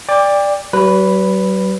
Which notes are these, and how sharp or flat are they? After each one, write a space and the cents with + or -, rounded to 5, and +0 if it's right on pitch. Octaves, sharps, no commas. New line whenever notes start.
D5 +0 G5 +35
F#3 +45 B4 +0